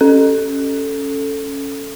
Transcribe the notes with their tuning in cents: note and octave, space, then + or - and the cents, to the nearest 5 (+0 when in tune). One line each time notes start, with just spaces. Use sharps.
C#4 +0 A4 +0